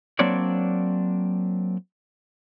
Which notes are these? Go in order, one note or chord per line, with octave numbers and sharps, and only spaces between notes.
F#3 A#3 C4 D4 C#5 D5